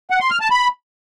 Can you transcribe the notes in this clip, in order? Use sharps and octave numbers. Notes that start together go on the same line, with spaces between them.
F#5
C6
F6
A5
B5